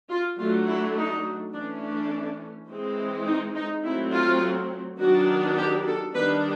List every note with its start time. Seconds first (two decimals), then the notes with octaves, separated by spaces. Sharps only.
0.09 F4
0.38 F#3 A3 D4 F4
0.68 E4
0.97 D#4
1.54 E3 A3 C#4 D4
1.82 D4
2.69 E3 G#3 C4
3.27 D#4
3.55 D#4
3.84 F#3 A3 C4 E4
4.13 F4
4.99 D#3 F#3 B3 D4 F#4
5.57 G4
5.86 A4
6.14 D#3 G3 B3 D4 B4